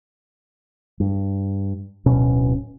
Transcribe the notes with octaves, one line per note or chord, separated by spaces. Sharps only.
G2
D1 B2 C#4